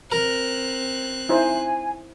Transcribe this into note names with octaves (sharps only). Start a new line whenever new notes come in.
C4 A#4 F#6
D#4 E4 C5 G#5